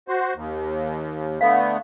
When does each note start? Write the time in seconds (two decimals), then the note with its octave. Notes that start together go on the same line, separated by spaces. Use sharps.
0.08 F#4 C5
0.35 D#2
1.41 D3 A3 B3 F5